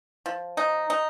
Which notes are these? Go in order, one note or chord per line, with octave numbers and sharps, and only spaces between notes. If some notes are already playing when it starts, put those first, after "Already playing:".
F3
D#4
D#4